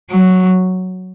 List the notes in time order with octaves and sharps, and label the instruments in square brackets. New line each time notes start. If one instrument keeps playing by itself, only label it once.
[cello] F#3